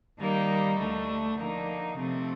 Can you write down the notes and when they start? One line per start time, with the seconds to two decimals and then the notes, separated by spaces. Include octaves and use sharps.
0.19 D#3 G3 A#3 D#4
0.77 D2 D3 A3
1.38 D3 F3 A#3 D#4
1.97 C3 F3 A3 C4